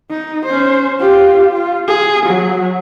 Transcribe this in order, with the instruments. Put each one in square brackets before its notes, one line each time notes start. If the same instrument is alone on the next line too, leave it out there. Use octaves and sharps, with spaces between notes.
[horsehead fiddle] D#4
C#4 C5
F4 G4
F4
G#4
F#3